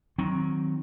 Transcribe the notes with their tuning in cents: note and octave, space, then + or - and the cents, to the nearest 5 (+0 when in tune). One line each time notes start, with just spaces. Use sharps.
D#3 +15 F#3 +0 C4 +0